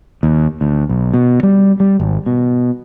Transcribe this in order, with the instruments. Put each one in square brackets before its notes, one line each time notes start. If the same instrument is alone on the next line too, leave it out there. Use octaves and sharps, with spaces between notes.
[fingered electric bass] D#2
D2
B1
B2
G3
G3
G#1
B2